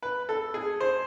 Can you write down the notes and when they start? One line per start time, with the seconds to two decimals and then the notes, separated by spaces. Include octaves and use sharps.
0.02 B4
0.29 A4
0.54 G#4
0.80 C5